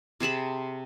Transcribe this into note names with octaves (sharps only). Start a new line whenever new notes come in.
C3 G#4 A5 B5